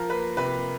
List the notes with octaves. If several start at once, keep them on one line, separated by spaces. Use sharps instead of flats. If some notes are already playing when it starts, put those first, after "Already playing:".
Already playing: F3 A#4
A#3 B4
C3 B4